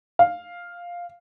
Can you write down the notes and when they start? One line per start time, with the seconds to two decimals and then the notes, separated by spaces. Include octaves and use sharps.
0.19 F5